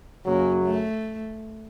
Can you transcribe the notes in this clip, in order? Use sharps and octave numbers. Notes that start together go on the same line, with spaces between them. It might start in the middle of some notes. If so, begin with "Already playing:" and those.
F#2 C#3 F#3 A#3
A3